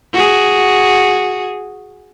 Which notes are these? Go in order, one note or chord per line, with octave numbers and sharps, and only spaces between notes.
F#4 G#4